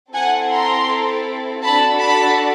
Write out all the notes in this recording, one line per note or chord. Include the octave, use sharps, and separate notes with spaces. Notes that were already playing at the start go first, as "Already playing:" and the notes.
C4 E4 A4 F#5 G#5
A#5 C6
D4 F#4 A4 A5 B5
A5 B5